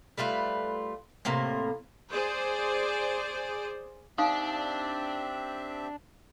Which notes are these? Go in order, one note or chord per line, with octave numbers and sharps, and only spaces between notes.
G3 A3 F4 B4
A2 C3 A#3 A#4
G#4 C5 D5
C4 D4 D#4 G4 E5 F5 D#6